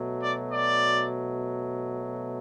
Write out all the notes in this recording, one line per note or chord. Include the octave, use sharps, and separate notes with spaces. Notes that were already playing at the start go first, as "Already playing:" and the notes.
Already playing: B2 F#3 A3
D5
D5